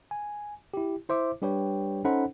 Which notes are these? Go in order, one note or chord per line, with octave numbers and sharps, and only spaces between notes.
G#5
E4 G4
E4 C5 E5 D6
G3 D4 G4 B4 C#5 G5
C#4 D#4 A4 C5 F#5 B5